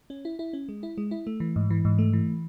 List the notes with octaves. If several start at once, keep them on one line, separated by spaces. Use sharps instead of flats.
C#4
E4
E4
C#4
G#3
E4
G#3
E4
A3
E3
G#2
E3
G#2
A3
E3